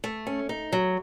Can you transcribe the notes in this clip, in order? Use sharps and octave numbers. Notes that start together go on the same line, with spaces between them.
A3
C#4
D#4
F#3